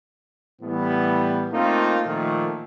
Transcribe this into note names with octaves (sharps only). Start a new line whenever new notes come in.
A2 E3 G3 B3
A3 A#3 C4 D#4 F4
A#2 D#3 F3 A3